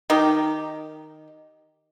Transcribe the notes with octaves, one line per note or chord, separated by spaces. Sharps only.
D#3 D#4 G4